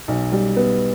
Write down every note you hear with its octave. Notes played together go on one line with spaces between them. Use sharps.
B1
G3
B3